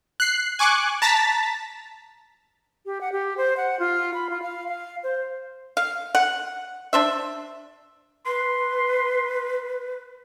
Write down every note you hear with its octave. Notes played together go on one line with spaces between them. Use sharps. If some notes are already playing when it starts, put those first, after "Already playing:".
F#6 C7
G#5 C#6 D6 F#6
A5 A#5 A6 B6
G4
F#5
G4
C5
F#5
F4
B5
F4
F5
F5
C5
F5
F#5
D4 C5 E5
B4 C6